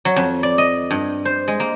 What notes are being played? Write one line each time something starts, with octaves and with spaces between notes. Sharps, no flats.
F#3
F2
D5
D#5
G2
C5
G#3
A#3